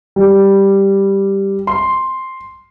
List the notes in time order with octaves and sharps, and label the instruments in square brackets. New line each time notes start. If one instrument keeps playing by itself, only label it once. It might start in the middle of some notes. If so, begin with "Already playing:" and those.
[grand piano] G3
C6